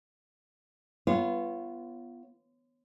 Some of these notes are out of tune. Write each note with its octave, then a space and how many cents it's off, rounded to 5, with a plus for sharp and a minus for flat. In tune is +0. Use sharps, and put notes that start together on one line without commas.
B3 -5 F4 -30 C#5 -20